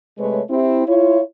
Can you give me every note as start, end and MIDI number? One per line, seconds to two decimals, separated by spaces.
0.18 0.40 48
0.18 0.40 56
0.18 0.40 57
0.18 0.40 71
0.18 0.40 73
0.49 0.83 60
0.49 0.83 64
0.49 0.83 67
0.86 1.19 64
0.86 1.19 65
0.86 1.19 73